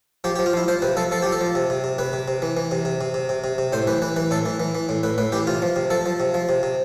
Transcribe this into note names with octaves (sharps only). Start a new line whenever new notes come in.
F3 G4
G4
F3
F4
F3 E4
F3 C5
C3 B4
F3 A4
F3 A4
F3 G4
A4
F3
C3
C3
C3
C3 B4
C3
C3
E3
E3
C3
C3
C3
C3
C3
C3
C3
A2 C5
E3 B4
E3 B4
E3 B4
A2 A4
E3
E3
E3
A2
A2 B4
A2 B4
E3 G4
C3 F4
F3
C3
F3 A4
F3
C3
F3
C3
C3